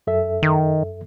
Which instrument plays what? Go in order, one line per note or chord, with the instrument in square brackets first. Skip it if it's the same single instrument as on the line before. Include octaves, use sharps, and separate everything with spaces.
[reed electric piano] F#2 A4 E5
[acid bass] D#3